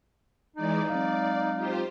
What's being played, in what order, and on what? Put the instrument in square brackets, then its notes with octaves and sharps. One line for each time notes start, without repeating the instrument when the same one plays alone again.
[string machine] E3 G#3 D5 [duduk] D#4
[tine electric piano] F#3 G#3 C4 [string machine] D5 [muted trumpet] F5
[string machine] F4 G4 C5